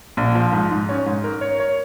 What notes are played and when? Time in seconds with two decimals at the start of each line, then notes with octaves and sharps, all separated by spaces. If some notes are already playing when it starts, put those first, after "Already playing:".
0.17 A#1
0.35 F3
0.53 G#2
0.71 G#2
0.89 C#4
1.06 G#2
1.24 A#4
1.41 C#5
1.60 C#5